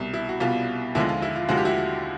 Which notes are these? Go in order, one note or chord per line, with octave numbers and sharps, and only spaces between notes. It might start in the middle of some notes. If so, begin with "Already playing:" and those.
Already playing: C2 B2 G3
E4
F#4
C2 B2 G3 F4
D#2 D3 F3 G#3 E4
F4
E4
F4
D#2 D3 F3 G#3 F#4
G4
E4 F#4